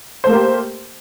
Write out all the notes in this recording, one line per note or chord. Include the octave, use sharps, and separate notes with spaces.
A3 A#3 G4 A#4 C5